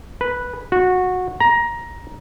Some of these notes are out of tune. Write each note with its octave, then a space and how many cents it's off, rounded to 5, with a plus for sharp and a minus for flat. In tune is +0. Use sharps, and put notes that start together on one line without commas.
B4 -5
F#4 -15
A#5 +15